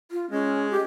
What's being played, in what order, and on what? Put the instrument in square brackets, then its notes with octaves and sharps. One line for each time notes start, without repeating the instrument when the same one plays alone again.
[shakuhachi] F4
[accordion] G#3 [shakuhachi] C#4
[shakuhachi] G4